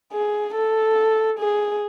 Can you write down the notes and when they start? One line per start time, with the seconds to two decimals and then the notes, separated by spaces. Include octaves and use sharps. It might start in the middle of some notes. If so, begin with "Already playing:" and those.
0.13 G#4
0.55 A4
1.39 G#4